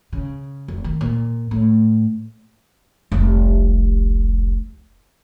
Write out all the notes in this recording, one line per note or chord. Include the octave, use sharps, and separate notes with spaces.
C#3
F1
D#3
A#2
A2
F1 C2